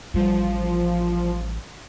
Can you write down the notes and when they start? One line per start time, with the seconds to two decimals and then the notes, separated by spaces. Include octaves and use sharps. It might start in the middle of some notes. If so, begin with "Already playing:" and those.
0.14 A1 F3 G3